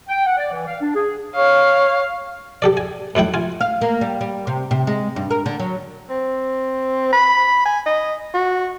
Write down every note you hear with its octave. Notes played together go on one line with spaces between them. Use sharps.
G5
F#5
D5
E3
F5
D4
G#4
C#5 F5
G4 A4 D5
G#5
F#2 A3 E4 G5
F4 G#5
F5
A#3
G3
G3
C3
C3
G#3
G2
A#4
D3
F#3
C4
B5
G#5
D#5
F#4